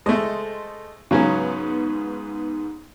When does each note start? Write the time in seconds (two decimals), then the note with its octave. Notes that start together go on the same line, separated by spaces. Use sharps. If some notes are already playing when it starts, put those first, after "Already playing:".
0.06 G#3 A3 A4 C5 D#5
1.11 G#2 C#3 F#3 B3 C#4